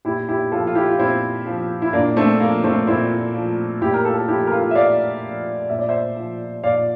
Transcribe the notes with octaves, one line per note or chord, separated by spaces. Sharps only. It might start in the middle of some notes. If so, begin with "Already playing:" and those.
A#2 E4 G4
E4 G4
F3 F4 A4
F4
E4 G4
F4
A#2 C4 E4
F3
E4
A#2 A#3 D4
A3 C4
F3 A#3
A3 C4
A#2 C4 E4
F3
A#2 E4 G4
A#4
F4 A4
A4
F3 E4 G4
A#4
F4 A4
E5
A#2 D5 F5
F3
A#2 E5
D5
C5 E5
F3
A#2 D5 F5